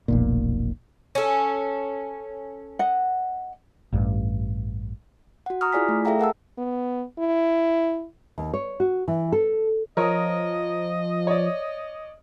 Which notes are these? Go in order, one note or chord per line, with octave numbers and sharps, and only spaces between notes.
F1 B1 A#2
C#4 A4
D#5 F#5
A1 G2
F#4 F#5
A#5 C#6 D#6 F6
E4 F4 G#4 D5 G#5 B6
A3
G#4 A4 E5 F5 G5 A#5
A#4 F#5 A5 E6
B3
E4
D#2
C#5
F#4
E3
A4
F3 A#4 C#5 D#5 D#6
C#5 D5